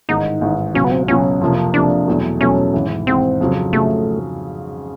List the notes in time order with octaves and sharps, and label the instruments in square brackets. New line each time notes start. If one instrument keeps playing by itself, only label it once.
[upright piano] A1 G#2 D#3 [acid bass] D#4
[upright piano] A1 G#2 D#3
[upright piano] C#2 B2 F#3 [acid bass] C#4
[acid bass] B3
C4
[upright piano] C#2 B2 F#3 [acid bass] C#4
[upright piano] F2 C3 F3 A#3
[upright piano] F2 C3 F3 A#3 [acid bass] D4
[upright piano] E2 B2 F#3 A3
[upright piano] E2 B2 F#3 A3 [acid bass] C#4
[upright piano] G#1 G#2 E3
[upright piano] G#1 G#2 E3 [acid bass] C4
[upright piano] F2 C#3 F#3
[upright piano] F2 C#3 F#3 [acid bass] A3